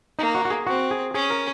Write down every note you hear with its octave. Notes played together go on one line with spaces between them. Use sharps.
A#3 D#4
F#4
F#4
G#4
C4 F#4
G#4
C#4 G#4
A#4